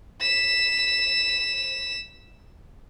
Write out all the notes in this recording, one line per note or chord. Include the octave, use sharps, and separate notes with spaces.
B6 E7